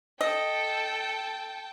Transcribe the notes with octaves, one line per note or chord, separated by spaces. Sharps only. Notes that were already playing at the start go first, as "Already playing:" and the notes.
A4 D#5 G5 A5